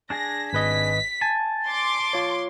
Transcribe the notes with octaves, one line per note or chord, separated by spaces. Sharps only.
D4 G#4 G#5 A#6
G#1 B4 D#5 B6
G#5 A5
C6 D6
F4 C#5